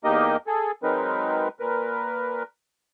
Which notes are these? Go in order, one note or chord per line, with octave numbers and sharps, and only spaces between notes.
E2 A#3 D#4 G4 A#4 D#5
G#4 A4
F#3 G#3 C4 D#4 A#4 B4
A#2 A#4 B4